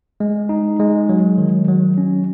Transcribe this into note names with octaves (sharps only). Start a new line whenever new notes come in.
G#3
D#4
G#3
F#3
D#3
F#3
C#4